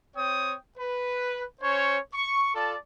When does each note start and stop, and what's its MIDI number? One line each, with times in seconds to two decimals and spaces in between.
0.16 0.55 60
0.16 0.55 73
0.16 0.55 79
0.16 0.55 87
0.78 1.44 71
1.62 1.99 61
1.62 1.99 72
1.62 1.99 73
2.14 2.51 85
2.55 2.76 65
2.55 2.76 69
2.55 2.76 74
2.55 2.76 81